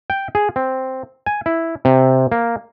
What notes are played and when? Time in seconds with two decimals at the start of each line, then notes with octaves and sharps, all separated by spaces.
0.10 G5
0.35 G#4
0.56 C4
1.26 G#5
1.46 E4
1.85 C3
2.32 A#3